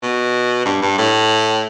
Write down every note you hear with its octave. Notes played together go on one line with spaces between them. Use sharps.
B2
G2
G2
A2